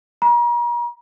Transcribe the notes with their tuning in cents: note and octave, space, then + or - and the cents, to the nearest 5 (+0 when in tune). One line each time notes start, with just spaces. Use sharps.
A#5 +40